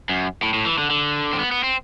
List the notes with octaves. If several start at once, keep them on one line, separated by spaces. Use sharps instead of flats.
F#2
A2
A2
E3
D3
D3
C4
B3
B3
C4